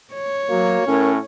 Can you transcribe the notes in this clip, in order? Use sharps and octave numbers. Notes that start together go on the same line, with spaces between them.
C#5
F#3 A#3 F#4
A2 C#4 A#4